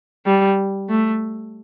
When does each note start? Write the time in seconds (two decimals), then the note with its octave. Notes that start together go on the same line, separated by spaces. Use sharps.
0.26 G3
0.90 A3